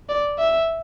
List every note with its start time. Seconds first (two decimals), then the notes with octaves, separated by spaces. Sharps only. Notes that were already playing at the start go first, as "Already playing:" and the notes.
0.09 D5
0.39 E5